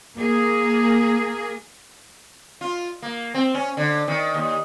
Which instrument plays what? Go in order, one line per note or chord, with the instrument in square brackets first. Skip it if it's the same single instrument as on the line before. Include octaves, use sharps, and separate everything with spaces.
[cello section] A#3 G#4
[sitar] F4
A#3
C4
C#4
D3
D#3
D#2